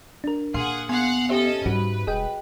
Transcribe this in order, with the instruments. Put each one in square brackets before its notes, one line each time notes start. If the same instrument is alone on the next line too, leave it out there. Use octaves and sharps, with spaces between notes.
[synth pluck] D4 A#4
[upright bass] A#2 [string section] G#4 F#5 [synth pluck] F5 C6 F6
[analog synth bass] B3 [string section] F5 F#5 [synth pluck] G#5 C6
[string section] C#4 A4 D#5 [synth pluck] G4 C5 E5
[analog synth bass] G#2 [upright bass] G3 [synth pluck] F#4 [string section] B4
[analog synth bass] E1 [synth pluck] G#4 D#5 G5